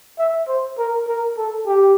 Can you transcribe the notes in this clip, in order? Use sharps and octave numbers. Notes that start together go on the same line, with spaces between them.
E5
C5
A#4
A#4
A4
G4